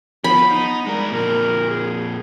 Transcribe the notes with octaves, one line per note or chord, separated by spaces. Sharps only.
F3 B3 B5
D#4
G3 G#3 A#4
F2 A#2 A#4
G#4